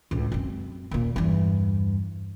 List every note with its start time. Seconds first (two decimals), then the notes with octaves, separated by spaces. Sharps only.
0.11 C#2 A2
0.32 F#2 C4
0.91 D#2 A#2
1.16 E2 G2